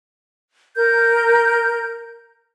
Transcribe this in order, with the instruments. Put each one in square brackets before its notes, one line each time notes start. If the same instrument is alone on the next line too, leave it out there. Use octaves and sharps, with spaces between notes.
[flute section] A#4 G6